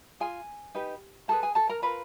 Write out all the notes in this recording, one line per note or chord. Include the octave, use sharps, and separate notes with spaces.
F4 G#4 G#5
D#4 G4 B4
E4 G#4 A4 B4 A5
G#4 G#5
A4 A5
A#4 A#5
F4 A#4 B4 B5